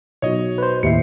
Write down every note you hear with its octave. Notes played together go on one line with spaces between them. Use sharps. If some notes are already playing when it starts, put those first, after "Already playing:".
B1 F#3 C#5 D#5
B4 C5
D#2 A2 G4 E5 C7 C#7